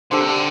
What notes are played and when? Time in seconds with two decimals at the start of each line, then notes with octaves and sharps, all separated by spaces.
0.11 D3 G3 D4 A4 C5
0.21 C3
0.28 D3